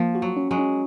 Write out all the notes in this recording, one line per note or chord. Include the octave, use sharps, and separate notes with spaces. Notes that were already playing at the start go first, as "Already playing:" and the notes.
Already playing: F3 A#3
F#4
F#3
C#4
F#3 G#3
C#4